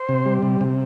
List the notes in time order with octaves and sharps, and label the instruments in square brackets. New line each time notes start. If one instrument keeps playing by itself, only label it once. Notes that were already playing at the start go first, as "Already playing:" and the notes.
Already playing: [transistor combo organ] C5
C3
G3
C3
C3